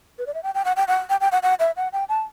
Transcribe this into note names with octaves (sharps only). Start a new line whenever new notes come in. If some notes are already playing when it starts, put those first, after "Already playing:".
B4
D5
E5
G5
G5
F#5
G5
F#5
G5
G5
F#5
F#5
E5
F#5
G5
A5